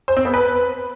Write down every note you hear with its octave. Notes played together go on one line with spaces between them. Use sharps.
C5
C4
B3
B4